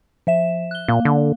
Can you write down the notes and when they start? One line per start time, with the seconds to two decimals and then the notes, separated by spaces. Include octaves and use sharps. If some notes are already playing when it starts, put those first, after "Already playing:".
0.27 F3 E5 E7
0.71 F#6 G7
0.88 A#2 A#3
1.05 D3